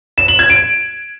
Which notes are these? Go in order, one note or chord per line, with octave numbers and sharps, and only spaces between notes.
E7
F#7
G#6
D7